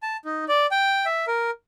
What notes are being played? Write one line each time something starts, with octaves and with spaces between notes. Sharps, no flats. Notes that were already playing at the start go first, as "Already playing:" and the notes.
A5
D#4
D5
G5
E5
A#4